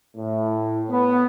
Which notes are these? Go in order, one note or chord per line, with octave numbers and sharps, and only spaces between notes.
A2
B3